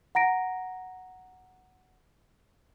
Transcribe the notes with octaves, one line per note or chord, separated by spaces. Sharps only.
F#5 A#5 A#6 D7